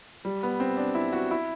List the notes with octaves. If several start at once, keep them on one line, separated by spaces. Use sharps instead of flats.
G3
B3
C4
D4
E4
F#4
E4